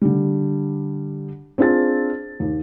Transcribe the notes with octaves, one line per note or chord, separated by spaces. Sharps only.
D3 G3
C4 D4 F4 G#4 A6
D#2